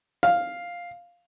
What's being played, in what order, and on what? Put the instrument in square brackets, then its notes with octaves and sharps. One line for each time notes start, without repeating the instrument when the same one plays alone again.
[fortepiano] F5